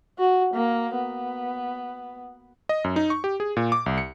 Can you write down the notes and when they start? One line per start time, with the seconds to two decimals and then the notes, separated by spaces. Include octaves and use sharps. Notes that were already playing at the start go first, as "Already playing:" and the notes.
0.19 F#4
0.54 A#3
0.96 B3
2.69 D#5
2.84 F#2
2.96 D#4
3.10 C#6
3.24 G4
3.40 G#4
3.57 A#2
3.72 D6
3.86 C2
3.98 C#7